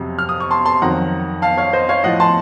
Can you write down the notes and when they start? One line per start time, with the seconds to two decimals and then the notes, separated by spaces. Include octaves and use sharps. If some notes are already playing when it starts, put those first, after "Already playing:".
Already playing: F2 C3 F#3
0.19 F6
0.29 D#6
0.40 C#6
0.50 A5 C6
0.65 A5 C6
0.82 F2 D#3 F#3 F#5 A#5
1.42 F5 A5
1.57 C#5 F5
1.73 C5 D#5
1.89 C#5 F5
2.04 A2 F3 D#5 F#5
2.20 A5 C6